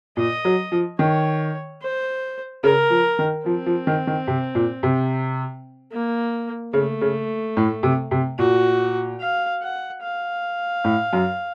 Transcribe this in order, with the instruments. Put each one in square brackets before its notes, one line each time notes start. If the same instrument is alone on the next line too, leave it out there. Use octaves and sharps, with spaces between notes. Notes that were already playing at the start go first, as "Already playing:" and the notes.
[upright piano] A#2 [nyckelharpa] D#5
[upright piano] F#3
F3
[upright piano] D#3 [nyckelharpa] C#5
[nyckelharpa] C5
[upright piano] C#3 [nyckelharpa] A#4
[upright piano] F3
D#3
[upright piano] F3 [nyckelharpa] C4
[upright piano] F3
D#3
D#3
C3
A#2
C3
[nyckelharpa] A#3
[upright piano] C#3 [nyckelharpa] A3
[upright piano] C#3
A2
C3
C3
[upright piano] A#2 [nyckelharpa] F#4
[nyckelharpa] F5
F#5
F5
[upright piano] A2
F#2